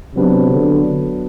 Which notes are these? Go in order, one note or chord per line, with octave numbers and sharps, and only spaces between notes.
C3 F#3 B3 D4
D3